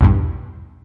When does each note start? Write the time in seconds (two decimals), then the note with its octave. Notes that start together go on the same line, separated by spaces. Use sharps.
0.01 B1 E2 G2